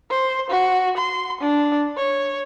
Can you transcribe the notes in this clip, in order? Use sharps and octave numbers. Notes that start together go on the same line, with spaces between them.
C5
F#4
C6
D4
C#5